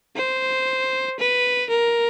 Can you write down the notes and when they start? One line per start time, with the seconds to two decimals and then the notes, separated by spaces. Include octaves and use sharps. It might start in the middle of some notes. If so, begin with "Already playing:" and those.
0.17 C5
1.19 B4
1.70 A#4